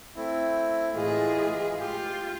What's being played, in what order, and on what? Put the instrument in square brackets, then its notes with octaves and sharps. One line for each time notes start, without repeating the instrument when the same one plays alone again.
[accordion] A3 C4 E4
[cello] A2 G#4 [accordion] E3 G#3 F4
[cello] F4 [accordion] G4